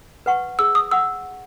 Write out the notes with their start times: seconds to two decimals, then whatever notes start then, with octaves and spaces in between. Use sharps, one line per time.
0.26 B4 F#5 C#6
0.59 G#4 E6
0.75 D#6
0.91 F#5 C#6 E6